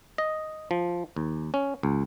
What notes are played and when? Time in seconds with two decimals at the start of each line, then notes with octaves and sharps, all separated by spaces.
0.18 D#5
0.71 F3
1.16 D#2
1.54 C#4
1.83 C#2